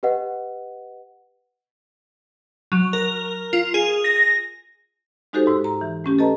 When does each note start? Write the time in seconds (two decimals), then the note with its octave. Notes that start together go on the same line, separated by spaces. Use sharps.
0.03 G4 B4 D#5 F#5
2.72 F#3
2.93 A#4
3.53 F4
3.74 G#4
4.04 A#6
4.16 A#6
5.33 G#3 D#4 F#4 G4 A4 C5
5.47 G#2 E6
5.64 A#5
5.81 E3
6.04 A3 C#4 G4
6.19 A4 B4 D#5 A5 A#5